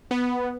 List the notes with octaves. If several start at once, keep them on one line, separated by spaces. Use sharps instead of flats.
B3